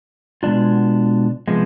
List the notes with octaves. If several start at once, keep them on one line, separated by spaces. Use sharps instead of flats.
B2 G#3 B3 D4 F4
C3 F3 G#3 B3